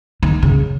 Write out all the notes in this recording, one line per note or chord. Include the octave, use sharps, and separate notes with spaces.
D#3
C#3